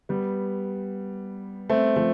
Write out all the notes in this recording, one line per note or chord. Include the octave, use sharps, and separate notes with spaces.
G3 B3
A3 C4
F3 A3